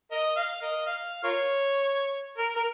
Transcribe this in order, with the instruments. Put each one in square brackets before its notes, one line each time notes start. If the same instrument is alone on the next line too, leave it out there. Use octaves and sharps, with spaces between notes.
[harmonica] A#4 D#5
F5
A#4 D#5
F5
F4 A#4 C#5
A#4
A#4